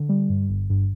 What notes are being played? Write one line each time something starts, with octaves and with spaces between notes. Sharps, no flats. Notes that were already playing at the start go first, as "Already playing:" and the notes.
Already playing: D3
G3
G2
G1
G2